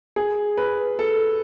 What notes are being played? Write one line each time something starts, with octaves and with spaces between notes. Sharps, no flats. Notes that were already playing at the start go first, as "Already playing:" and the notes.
G#4
B4
A4